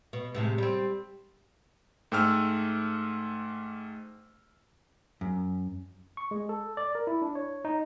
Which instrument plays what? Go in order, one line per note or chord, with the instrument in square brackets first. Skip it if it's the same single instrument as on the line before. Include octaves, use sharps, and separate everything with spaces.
[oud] B2
A2 C3 G#3
G3 C4
[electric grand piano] G#2 A3 G5 E6 F6
[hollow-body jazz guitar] F#2
[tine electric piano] C#6
G#3
A4
D5
A#4
E4
D4
C#5
D#4